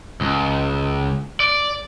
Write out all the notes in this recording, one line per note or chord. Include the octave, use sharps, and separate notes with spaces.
C#2
D5